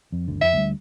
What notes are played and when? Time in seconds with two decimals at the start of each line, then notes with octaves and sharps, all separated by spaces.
0.12 F2
0.28 G1 D2 D3
0.41 F2 E5
0.53 D2 G3